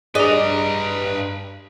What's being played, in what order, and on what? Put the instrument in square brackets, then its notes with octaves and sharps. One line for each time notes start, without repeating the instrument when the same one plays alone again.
[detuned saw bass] G2 [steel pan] G#4 D5 D6 [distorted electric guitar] B4 A#5 [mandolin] D#5